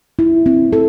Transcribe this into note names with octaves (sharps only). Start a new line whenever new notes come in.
E4
C4
A4